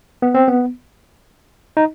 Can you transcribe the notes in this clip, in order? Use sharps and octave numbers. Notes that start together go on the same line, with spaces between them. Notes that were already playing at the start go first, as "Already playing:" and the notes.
B3
C4
B3
D#4